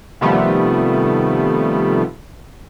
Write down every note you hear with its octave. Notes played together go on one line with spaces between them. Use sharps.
C3 D#3 F3 G3 A3 B3